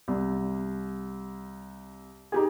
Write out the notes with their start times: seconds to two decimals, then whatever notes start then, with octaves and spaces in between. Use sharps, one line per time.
0.08 C2
2.32 D#4 G4 G#4